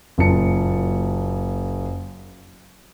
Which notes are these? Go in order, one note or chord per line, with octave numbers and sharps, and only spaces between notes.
F#1 F#2 A#2 A5 C#7